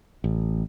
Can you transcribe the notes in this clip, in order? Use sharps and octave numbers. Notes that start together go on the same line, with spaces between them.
A1